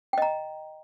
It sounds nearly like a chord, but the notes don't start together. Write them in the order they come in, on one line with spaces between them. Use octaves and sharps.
G5 D#5 A#5